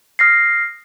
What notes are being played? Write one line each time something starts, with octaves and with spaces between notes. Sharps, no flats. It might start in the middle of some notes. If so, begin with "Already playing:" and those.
D#6 F6 A#6 C7